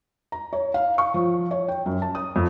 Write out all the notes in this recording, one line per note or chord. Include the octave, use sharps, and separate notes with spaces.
A#5
C#5
F5
C#6
F3
C#5
G5
F#2
A5
D#6
F2